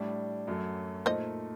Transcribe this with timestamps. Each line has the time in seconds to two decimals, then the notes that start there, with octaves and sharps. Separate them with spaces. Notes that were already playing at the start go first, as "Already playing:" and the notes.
Already playing: A2 G3 D4 D5
0.48 F#2 F#3 A3
1.06 A#2 A3 D#4 C5 D#5